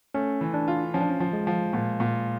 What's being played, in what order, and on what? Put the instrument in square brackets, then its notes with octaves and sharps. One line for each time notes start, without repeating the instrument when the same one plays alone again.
[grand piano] A3 [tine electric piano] C#4
[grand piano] E3
[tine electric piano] D4
[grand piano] F4
[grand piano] F3 [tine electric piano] C#4
[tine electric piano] D4
C#4
[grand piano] F3
[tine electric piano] G#3
[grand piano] F3
A#2
A#2